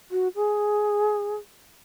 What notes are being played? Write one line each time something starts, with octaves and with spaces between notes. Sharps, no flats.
F#4
G#4